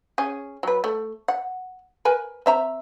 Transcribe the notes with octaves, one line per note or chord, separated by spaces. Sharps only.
C#4 G#4
F#3 B4
A3
F#5
A#4 B4 G#5
C4 E5 A#5